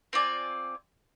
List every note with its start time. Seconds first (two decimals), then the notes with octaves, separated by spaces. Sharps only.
0.13 C4 F4 D5 G#5